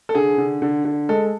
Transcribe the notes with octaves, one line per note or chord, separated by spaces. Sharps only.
A4
D3 G#4
D3
D3
D3
G#3 A4